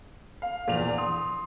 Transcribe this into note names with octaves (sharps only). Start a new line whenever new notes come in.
F5
A#1 E2 A#2 F7
C6 D#6